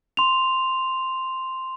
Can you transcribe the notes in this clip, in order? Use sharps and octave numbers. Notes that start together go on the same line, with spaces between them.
C6 F7